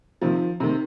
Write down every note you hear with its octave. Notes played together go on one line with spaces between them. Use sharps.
C3 D#3 F3
C3 D#3